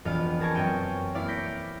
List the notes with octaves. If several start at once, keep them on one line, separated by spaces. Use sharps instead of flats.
E1 F2 B3 F4 F5 F6
G#4 A#4 A5 C#6 G#6 D7
F#2 C4 G5 C#6 D#7
A#3 E4 D5 F5
G6 A#6 B6 C#7 D7